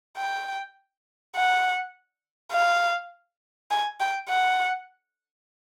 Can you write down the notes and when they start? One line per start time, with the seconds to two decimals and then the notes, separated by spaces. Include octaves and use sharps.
0.17 G5
1.36 F#5
2.52 F5
3.71 G#5
4.00 G5
4.29 F#5